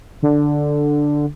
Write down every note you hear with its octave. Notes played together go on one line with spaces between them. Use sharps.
D3